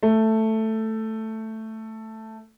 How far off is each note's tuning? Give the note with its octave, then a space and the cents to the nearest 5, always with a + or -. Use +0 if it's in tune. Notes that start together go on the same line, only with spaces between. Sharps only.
A3 +5